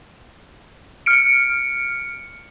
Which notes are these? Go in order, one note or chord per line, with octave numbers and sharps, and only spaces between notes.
F6 C#7 D7